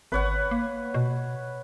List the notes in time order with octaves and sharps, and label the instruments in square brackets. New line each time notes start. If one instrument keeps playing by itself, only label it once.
[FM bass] G#1 [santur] B4 C#5 F#5
[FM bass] A#3
B2